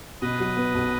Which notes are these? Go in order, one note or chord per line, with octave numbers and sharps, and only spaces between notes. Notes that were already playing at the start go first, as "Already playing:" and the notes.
B2 B4 D#5
F#3
B3
B1